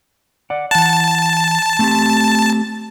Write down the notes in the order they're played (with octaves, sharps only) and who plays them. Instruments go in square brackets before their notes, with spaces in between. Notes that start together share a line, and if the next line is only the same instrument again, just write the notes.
[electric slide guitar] D5 F#5
[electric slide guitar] E3 F#5 [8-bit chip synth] A5
[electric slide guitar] A3 C4 G4